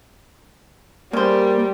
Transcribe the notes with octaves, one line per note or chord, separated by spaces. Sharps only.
C#3 G3 A#3 C5